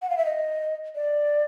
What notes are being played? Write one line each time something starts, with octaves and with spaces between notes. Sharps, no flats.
F#5
F5
E5
D#5
D5